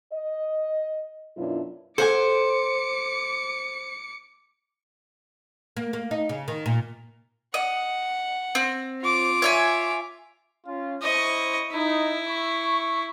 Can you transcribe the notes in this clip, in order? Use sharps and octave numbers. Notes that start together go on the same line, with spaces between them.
D#5
F#2 B2 F#3 D4 E4 F4
A4 C5 F#5 G#5 D6 C#7
A#3
A#3
D#4
C#3
D#3
A#2
D#5 F#5
C4
F4 D6
C#5 E5 G#5
C#4 F4
E4 C5 D#5 C#6
D#4 E4
C#6